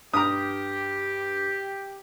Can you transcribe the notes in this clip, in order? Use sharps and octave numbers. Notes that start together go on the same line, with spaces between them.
G2 G4 A#5 D#6 F6